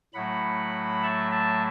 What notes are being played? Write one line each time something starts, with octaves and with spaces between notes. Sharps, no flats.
A2 F#3 A3 F#5 B5
E5 A5
E5 A5